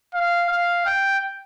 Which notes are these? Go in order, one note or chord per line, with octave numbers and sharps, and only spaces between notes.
F5
F5
G5